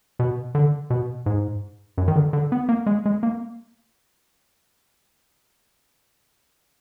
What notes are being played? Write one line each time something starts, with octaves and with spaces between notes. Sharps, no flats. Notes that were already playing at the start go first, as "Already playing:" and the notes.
B2
D3
B2
G#2
F#2
D#3
D3
D3
B3
A#3
G#3
G#3
A#3